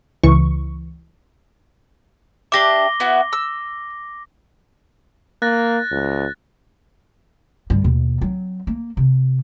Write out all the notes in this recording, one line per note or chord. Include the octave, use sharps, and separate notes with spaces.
C#2 E3 C#6
D4 G4 E5 D6 A#6 G7
B3 E4 F#4
E6
A#3 F#6 A6 A#6
C#2
G2 D3
D#2 B2
F#3 C4
A#3
C3